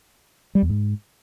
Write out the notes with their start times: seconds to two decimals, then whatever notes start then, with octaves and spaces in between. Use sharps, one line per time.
0.55 G3
0.62 E2
0.70 G#2